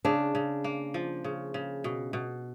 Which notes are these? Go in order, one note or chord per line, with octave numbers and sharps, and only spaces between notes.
C#3 D4
C#3
A#3
F3
C#3
C#3
B2
B2